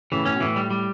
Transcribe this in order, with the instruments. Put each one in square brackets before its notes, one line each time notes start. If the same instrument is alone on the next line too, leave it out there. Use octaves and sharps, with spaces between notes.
[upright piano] A2 C#3 [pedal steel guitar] E3
[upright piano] A2 [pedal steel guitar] C#4
[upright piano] B2
[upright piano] A2 [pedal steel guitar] E3
[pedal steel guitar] G3
G3